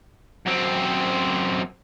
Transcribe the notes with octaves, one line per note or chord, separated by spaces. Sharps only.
F#2 C4